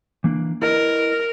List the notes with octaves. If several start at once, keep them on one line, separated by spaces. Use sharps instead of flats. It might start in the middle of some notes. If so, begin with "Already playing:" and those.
E3 A#3 D4
E4 A#4 B4 D#5